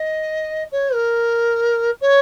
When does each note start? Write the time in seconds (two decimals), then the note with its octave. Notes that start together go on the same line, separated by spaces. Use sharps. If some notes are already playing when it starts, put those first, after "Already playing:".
Already playing: D#5
0.72 C#5
0.93 A#4
2.01 C#5